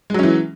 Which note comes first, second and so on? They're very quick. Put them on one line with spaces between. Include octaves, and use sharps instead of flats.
G#3 F#3 C#4 E3